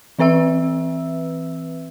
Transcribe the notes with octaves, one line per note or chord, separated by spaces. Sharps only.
E3 C4 B4 E5 E6